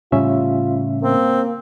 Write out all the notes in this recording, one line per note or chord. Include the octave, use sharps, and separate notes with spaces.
A2 C#3 G3 C#4 F4 E5
A#3 C4